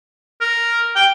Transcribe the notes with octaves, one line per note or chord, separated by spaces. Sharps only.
A#4
G5